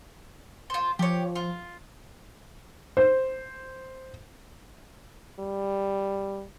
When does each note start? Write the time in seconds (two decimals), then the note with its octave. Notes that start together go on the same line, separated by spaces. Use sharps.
0.70 F4 C5
0.99 F3 G4 C#5
1.36 F4
2.97 C5
5.39 G3